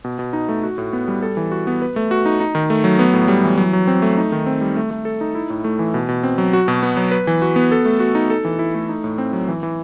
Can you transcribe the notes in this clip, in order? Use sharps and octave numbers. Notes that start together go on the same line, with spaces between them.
B2
B2
D#4
A3
F#4
A2
B3
G3
A4
E3
F#4
B3
B4
A3
F#4
D#4
D#4
D#3
A3
F#3
B3
A2
G3
E3
F#3
F#3
C4
A3
D#4
D#3
C4
G3
A3
A3
A4
D#4
E4
A2
A3
E3
B2
B2
C4
F#3
F#4
B2
B3
F#3
B4
E3
F#4
B3
A4
A3
F#4
D#4
A4
E3
E4
A3
D#4
A2
C4
F#3
E3
E3